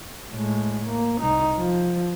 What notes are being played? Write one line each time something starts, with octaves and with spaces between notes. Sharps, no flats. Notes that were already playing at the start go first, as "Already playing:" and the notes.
A2 G#3
A#3
C2 D#4
F3